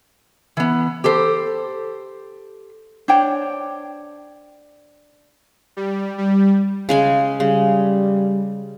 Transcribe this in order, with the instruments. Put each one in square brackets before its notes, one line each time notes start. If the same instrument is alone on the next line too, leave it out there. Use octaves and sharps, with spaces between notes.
[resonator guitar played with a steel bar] E3 B3
G4 A4 C5
[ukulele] D4 C5 C#5 G5
[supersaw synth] G3
G3
[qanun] C#3 G#3 G#5
[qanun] C#3 [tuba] G3